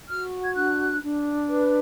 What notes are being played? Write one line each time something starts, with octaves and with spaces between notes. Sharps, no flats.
F#4 F6
G#6
D4 F#6
D4
B4